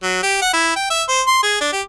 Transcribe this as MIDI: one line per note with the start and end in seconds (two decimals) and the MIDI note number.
0.03 0.23 54
0.23 0.41 67
0.42 0.53 78
0.53 0.74 64
0.76 0.89 79
0.90 1.03 76
1.08 1.22 72
1.27 1.41 84
1.43 1.57 68
1.61 1.68 62
1.73 1.81 67